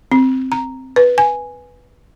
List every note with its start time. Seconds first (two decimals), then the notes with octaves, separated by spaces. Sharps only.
0.12 C4
0.52 A#5
0.96 B4
1.18 G#5